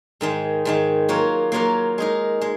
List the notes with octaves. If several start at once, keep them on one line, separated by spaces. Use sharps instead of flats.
G#2 D#3 G#3
G#2 D#3 G#3
F#3 A#3 F4 A#4 C#5
F#3 A#3 F4 A#4 C#5
G#3 D#4 A#4
G#3